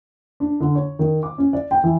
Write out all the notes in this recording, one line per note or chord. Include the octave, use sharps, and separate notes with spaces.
D4
D3
C#5
D#3
D6
C#4
D5
G5
E3